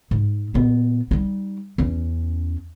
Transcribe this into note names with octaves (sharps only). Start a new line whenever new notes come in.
G#2
A#2 B3
G3 D#4
E2 C#4